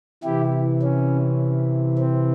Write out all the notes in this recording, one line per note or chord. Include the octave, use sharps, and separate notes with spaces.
C3 E3 E4 G4
C#4
C4